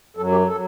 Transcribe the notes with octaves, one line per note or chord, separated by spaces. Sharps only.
F#2 F#3 A4
G4
F#3 A4